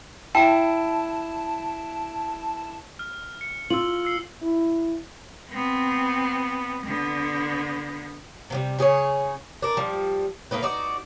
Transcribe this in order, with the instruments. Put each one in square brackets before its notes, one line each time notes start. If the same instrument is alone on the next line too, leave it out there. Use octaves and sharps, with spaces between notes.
[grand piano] E4 [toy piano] G5 [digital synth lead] A5
[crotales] F6
C#7
[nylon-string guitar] F4 [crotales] E6 F#7
[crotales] E6 C7
[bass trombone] E4
[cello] B3 C4
D3 B3
[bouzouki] C3 F3 G3
C#3 G#4 C5 C#5
D4 A#4
F3 G3
A3 A#3 D#4 B4
D#4 F#4 D5